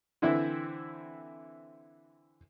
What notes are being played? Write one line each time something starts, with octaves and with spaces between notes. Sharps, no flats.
D3 E3 C4 E4 E5